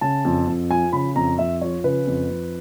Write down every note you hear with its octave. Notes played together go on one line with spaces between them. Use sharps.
C#3 A5
F2
F2
F3 G#5
C#3 B5
F2 A#5
F2 E5
F3 C#5
C#3 B4
F2
F2